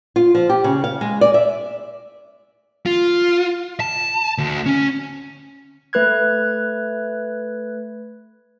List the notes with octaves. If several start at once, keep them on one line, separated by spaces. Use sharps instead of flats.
F4
F3
G4
C#3
F5
G#3
D5
E5
F4
A5
D2
C#4
A3 B4 F#6 G#6